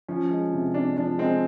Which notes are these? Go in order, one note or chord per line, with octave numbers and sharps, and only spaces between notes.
F3 C#4
G#3
C3
C3 D4
F3 D4
G#3 C4